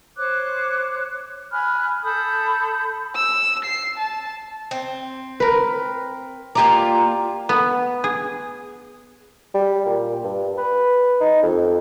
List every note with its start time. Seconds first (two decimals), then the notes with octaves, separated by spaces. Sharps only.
0.17 C5 C#5 D6 F#6
1.52 G#5 B5 F6 F#6
2.03 A4 B5 D#6 G6
3.16 E6
3.65 C7
3.98 A5
4.71 C4
5.40 A#4 B4
6.55 A#3 F4 G4 D5 A#5
7.49 B3
8.04 G#4
9.54 G3
9.86 A#2
10.24 G2
10.58 B4
11.21 D#4
11.43 F2